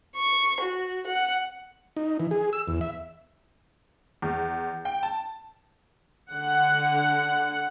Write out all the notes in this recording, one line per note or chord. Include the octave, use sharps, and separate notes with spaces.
C#6
F#4
F#5
D#4
E3
G#4
E6
E2
E5
E2
G5
A5
D3 F#5